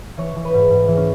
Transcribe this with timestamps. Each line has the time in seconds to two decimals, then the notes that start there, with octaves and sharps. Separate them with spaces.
0.17 E3 C#5
0.36 E3
0.45 B4
0.54 G#2
0.70 G#2
0.88 E3
0.97 C#4